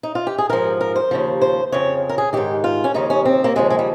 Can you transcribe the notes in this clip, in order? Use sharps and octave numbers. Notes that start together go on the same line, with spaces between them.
D#4
F4
G4
G#4
G#2 F3 A#4
A#4
C5
D#2 C#3 F3
C5
F2 C#3 F3 C#5
A#4
G#4
G#2 D#3 G4
F4
C#4
D#2 C#3 F3 D#4
C#4
C4
A#3
D#2 C#3 F3 G#3
G#3
G3